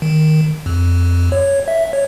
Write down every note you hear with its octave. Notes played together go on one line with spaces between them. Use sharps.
D#3
F2
C#5
E5
C#5